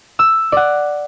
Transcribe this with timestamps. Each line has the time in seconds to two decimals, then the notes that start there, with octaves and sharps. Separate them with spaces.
0.19 E6
0.52 D5 F#5